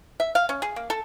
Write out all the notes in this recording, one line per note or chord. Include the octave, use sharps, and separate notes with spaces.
E5
F5
C#4
G#4
A#3
A4